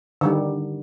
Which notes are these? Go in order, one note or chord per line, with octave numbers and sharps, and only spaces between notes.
D3 D#3 G3